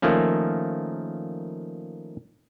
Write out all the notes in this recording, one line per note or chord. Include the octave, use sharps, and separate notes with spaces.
D#3 F3 A3 A#3 C#4